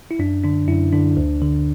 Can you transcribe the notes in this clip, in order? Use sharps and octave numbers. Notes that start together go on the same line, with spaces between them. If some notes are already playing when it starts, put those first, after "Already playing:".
E4
F#2 D4
D3 D4
F#2 E4
D3 D4
D2
D3